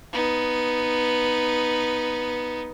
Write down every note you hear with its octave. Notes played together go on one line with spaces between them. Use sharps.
B3 D#4